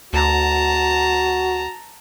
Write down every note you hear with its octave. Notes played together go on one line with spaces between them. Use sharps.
D2 F#4 A5 A#5